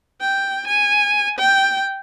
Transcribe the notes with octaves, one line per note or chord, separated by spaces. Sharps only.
G5
G#5
G5